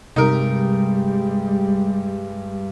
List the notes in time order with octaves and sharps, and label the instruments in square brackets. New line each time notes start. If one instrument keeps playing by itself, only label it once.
[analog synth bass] G2 [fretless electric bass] C3 [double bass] G3 G#3 [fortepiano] D#4 A#4